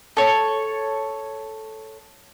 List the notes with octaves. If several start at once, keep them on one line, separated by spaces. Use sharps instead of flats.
A4 C#5